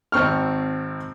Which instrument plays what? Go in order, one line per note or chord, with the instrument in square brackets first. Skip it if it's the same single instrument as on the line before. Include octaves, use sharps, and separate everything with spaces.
[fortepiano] G#1 C4 C#6 F6